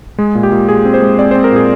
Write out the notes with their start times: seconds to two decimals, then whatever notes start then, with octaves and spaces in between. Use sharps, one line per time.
0.18 G#3 G#4
0.35 A#2
0.43 G4
0.52 A#2
0.69 A#2 G#4
0.85 C4
0.94 C5
1.02 G#3
1.19 C4 D5
1.31 C4 C5
1.44 A#4
1.52 A#2 G#4